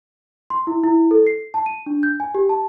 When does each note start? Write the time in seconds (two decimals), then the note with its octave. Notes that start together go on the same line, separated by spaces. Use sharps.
0.50 C6
0.67 E4
0.83 E4
1.11 A4
1.27 C7
1.54 A5
1.66 D#7
1.86 D4
2.03 G6
2.20 G#5
2.35 G4
2.49 A5